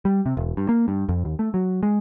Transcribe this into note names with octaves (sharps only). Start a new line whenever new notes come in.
G3
C3
E1
G2
A#3
G2
F2
D#2
A3
F#3
G#3